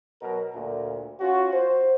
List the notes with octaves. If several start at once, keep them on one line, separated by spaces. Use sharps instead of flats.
B2 F#3 A#4
D2 A#2
C#4 F4 F#4
C5